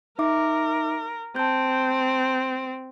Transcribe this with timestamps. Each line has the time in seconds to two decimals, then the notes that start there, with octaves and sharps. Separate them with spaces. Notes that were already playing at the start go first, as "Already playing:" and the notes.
0.19 D#4 A#4 E5 D6
1.36 C4 A5 G6